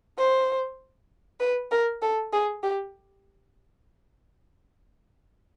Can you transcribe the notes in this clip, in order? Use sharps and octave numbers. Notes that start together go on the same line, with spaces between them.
C5
B4
A#4
A4
G#4
G4